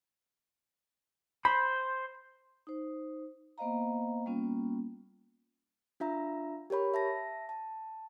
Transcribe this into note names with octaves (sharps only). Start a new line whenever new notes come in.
C5 B5
D#4 C5
A#3 B3 C5 D#5 F5 A#5
G3 A#3 B3 C#4 F4
D4 F4 E5 A#5
G4 A#4 C#5 B5
E5 A5 A#6
A5